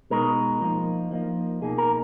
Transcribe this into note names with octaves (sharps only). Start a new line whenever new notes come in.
B2 G#3 D#4 A#4
F3 A#3 D#4
F3 A#3 D#4
B2 A#3 D#4 G#4
A#4